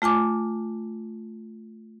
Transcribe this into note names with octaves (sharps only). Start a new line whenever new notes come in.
A3 F4 G#5 D6